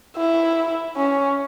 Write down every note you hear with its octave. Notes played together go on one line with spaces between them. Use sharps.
E4
C#4